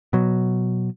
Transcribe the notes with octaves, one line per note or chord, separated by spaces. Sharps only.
B2 F#3